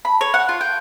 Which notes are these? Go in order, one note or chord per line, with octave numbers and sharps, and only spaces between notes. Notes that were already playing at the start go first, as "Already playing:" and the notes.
B5
C#5
F#5
F4
G5